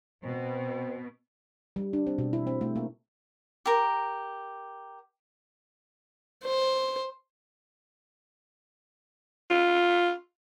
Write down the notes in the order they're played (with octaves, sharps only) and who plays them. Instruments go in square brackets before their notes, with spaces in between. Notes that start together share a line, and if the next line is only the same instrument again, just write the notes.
[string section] B2 [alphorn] C4
[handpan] G3
D4
C4
B2
E4
C4
A3
A#3
[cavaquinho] G4 A#4
[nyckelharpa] C5
[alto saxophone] F4